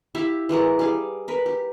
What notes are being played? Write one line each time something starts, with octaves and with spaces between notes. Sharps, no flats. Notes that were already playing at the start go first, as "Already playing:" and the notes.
E4 G4 E5 F5
E3 G#3 A#4 F#5
G3 G#4 F5
A#4 B4
G4